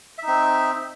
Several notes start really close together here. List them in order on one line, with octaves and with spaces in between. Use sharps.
E5 D#4 C4